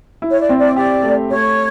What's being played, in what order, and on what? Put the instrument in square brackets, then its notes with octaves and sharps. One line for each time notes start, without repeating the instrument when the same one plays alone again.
[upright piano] E4
[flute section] C#5
D5
[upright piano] C4
[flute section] D5
[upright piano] G4 [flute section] D5
[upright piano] A3
[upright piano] A3 [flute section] C#5